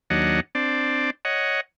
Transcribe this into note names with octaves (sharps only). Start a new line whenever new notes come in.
D#2 F#3 D4 C#5 D#5 F#5
C4 D4 D5
C#5 D#5 F#5